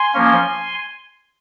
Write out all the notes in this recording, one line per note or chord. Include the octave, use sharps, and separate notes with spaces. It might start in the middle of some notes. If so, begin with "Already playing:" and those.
Already playing: G#5 C6
F3 A#3 C#4